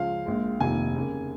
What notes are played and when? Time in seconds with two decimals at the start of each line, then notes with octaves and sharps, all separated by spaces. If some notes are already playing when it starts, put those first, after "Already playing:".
Already playing: C#2 C#3 F3 F5
0.26 A#1 A#2 G#3
0.60 F1 D#2 D#3 A#3 G#5
0.95 D#2 C#3 A#3